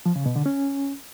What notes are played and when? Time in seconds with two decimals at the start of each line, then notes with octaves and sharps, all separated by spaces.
0.06 F3
0.16 C#3
0.26 B2
0.36 D3
0.46 C#4